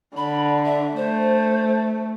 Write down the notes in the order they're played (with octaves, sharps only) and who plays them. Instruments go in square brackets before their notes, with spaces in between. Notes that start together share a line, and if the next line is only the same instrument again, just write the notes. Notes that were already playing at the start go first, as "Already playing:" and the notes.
[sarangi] D3 [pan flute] B5
[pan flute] E5
[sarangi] A3 [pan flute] C5